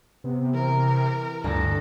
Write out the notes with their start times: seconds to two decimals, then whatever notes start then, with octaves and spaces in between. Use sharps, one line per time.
0.24 C3 B3
0.54 E3 A#4
1.44 G1 D2 A4 A#6